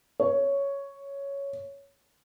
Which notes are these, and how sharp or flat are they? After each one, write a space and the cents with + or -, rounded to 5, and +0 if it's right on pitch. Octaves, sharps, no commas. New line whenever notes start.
C#5 +5